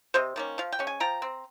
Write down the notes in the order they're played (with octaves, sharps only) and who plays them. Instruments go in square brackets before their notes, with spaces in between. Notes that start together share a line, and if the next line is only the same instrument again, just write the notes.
[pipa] C3 C5 D#5
D#3 A#3 C#4
F3 F5
G5
G#3 C#4
G#5
F3 G5 A#5
C4